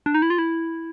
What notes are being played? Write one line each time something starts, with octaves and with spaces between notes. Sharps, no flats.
D4
D#4
E4
F4
E4